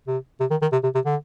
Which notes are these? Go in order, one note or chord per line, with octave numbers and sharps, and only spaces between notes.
C3
C3
D#3
D#3
C3
C3
C3
D3